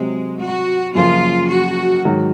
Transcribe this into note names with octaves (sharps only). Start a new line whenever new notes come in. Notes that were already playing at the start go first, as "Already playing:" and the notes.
Already playing: C3 F#3 G#3 C4
F#4
F#2 C#3 F3 A#3 F4
F#4
G#2 D#3 F#3